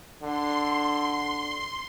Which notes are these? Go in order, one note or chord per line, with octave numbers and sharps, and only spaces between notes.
D3 C6